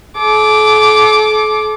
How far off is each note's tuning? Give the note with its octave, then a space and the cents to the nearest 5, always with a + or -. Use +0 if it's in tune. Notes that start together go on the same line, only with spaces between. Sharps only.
A4 -40 D6 +0